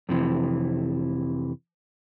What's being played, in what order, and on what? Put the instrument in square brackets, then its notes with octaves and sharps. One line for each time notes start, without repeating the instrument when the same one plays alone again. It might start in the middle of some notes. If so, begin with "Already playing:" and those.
[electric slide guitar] F2 C3 E3